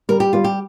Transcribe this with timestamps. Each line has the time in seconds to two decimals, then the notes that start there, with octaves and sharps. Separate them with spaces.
0.09 G3 A#4
0.20 G4
0.33 G3 F4
0.44 G4